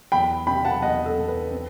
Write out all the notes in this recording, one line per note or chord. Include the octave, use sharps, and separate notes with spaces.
E2 G5 B5
C3 G5 B5
F#5 A5
E2 D#5 F#5
A4
E2
B4
C4